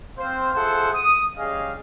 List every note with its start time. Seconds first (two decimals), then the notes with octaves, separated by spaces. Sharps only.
0.18 C4 C5 F5
0.54 F4 G#4 A4 C5 E5 F#5
0.93 D#6
1.36 G3 C#4 G#4 D#5 F5